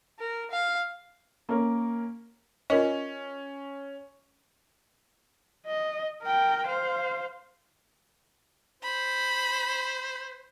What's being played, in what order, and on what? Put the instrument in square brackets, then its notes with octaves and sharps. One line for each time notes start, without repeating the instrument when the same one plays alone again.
[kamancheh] A#4
F5
[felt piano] A#3 C#4 A#4
[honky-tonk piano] C#4 [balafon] F4 A#4 D#5
[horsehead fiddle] D#5
A#4 G5
C5 F5
[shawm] C5 [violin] B5